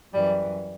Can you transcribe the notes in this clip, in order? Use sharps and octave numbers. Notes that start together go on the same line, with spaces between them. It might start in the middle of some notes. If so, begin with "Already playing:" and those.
F#2 E3 G3